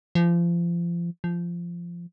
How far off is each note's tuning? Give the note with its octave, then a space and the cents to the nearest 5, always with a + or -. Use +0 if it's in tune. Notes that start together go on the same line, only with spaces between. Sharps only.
F3 -30
F3 -15